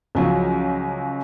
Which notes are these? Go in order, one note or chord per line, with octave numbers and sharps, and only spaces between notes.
C#2 F3 F#3